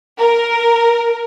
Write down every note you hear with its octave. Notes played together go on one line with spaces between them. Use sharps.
A#4